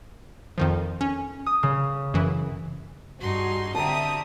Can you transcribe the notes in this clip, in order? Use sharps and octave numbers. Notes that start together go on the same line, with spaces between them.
F2 D#3 F3
C#4
D#6
C#3
F#2 E3
G2 D#4 F#4 G#4 C6
D3 C4 F#4 G4 E5 A5 A#5 D#6